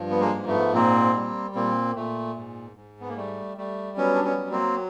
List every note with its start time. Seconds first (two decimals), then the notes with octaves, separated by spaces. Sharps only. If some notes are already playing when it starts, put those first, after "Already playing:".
Already playing: G2 F3
0.10 B3
0.21 G#3 A#3
0.35 G#2
0.47 A3 B3
0.74 A#2 A#3 C4
1.15 G3
1.55 A#2 A#3 C4
1.96 A#2 A3
2.36 G#2
2.77 G#2
3.01 B3
3.09 A#3
3.17 G3 A3
3.57 G3 A3
3.97 F#3 B3 C#4
4.15 D4
4.24 B3 C#4
4.38 F#3
4.51 A#3 C4